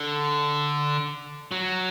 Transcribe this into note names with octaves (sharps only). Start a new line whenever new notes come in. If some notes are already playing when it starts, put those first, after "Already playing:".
Already playing: D3
F#3